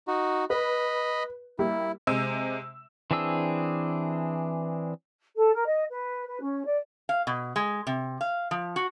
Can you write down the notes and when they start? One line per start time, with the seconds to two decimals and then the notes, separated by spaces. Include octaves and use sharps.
0.08 D#4 F#4
0.50 B4 D#5 B5
1.59 G3 A#3 E4 G4
2.07 C3 G#3 E6
3.11 E3 C4 D4 G#4 E6
5.36 A4
5.54 A#4
5.68 D#5
5.90 B4
6.28 B4
6.40 C#4
6.66 D5
7.09 F5
7.27 B2
7.56 G#3
7.87 C3
8.21 F5
8.51 F3
8.76 F#4